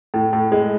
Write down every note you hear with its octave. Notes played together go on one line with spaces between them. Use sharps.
A2
A2
G#3